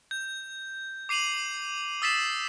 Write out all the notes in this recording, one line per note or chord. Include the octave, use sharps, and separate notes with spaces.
G6
D6 C7 D#7 F7 F#7
D#6 E6 A6 B6 C7 E7